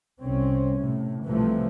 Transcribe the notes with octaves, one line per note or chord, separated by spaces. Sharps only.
C2 C4 C#4
A2 C3
C2 C3 E3 F3 A3